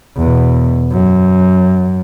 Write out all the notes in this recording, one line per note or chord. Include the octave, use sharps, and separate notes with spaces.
E2 B2
F#2